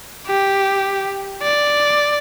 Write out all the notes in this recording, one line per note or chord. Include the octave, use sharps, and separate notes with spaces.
G4
D5